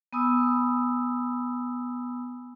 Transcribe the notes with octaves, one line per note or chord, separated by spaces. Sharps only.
B3 G#5 B5 D#6 E6